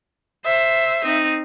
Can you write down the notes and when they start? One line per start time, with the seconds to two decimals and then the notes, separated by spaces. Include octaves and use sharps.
0.46 C5 E5
1.04 C4 D#4